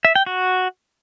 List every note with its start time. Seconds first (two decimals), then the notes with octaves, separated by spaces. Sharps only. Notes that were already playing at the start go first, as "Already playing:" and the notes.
0.05 E5
0.16 G5
0.26 F#4